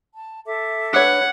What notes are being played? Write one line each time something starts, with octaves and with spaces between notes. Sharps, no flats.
A5
A4 E5 D6
D4 B4 C#5 F#5